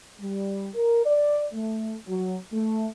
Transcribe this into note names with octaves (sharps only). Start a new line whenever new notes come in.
G3
A#4
D5
A3
F#3
A3